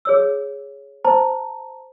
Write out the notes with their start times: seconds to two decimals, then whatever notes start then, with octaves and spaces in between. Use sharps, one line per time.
0.05 G#4 C#5 E6
1.05 C5 A5 A#5